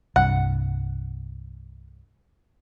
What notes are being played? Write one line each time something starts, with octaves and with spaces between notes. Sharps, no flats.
C2 G2 F#5